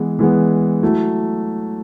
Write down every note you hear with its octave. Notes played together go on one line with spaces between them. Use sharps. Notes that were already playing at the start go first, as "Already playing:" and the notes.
Already playing: E3 G#3 B3
E3 G#3 B3
F#3 A3 E4